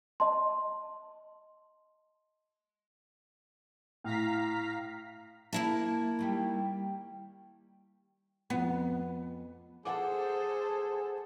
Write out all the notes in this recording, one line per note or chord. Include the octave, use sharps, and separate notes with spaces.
D#5 A5 C6
A2 F5 A#5 B6
A#3 E4 E5 A5
D#3 G3 G4
F2 F3 B3
G#4 A4 C5 F#5 D6